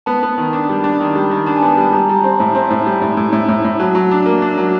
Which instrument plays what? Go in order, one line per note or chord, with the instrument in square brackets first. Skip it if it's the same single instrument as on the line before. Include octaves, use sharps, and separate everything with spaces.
[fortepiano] B3 [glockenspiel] A5
[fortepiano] B3
D#3
[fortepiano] D4 [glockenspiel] A5
[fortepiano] G3
D4
D#3
G3
D#3
[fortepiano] D4 [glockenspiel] A5
[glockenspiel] G#5
[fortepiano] B3 [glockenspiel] A5
[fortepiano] G3 [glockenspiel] A5
[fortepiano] G3 [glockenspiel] A#5
[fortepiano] G3
C4
A2
C4
A2
G3
A2
A2
A2
A2
A2
[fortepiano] F#3 [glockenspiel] A5
[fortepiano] F#3
D4
A#3
D4
F#3